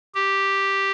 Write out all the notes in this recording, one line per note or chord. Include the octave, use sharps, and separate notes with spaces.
G4